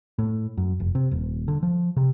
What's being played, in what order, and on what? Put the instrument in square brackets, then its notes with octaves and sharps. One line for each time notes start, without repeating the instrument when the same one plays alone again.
[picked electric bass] A2
F#2
F1
C3
D#1
D3
F3
C3